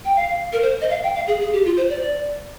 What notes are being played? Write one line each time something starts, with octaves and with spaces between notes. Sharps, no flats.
G5
F5
A#4
C5
D#5
F5
G5
F5
G#4
G#4
G4
F4
C5
D5